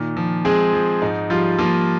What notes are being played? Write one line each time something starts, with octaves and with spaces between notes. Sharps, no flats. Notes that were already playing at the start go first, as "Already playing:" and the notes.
Already playing: A#2 D#3
F3
G#3 C4 G#4
F3
G#2 D#4
F3 G3 F4
F3 A#3 F4